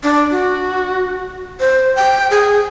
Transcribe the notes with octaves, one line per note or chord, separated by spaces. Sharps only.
D4
F#4
C5
G5
G#4